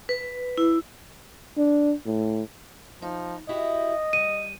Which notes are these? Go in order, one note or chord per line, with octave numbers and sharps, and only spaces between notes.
B4
E4
D4
A2
F3 D#4
E4 F#4 G4 D#5
G3 D#7